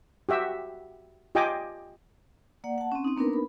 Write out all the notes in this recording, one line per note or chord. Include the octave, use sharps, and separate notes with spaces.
F#4 G4 E5
F4 G4 D#5 G5 G#5 D6
A#3 D5 F#5
F#5 A5
C4 C#4
C4 D#4
A#3 B3 D4 D#4 A#4 B4
B5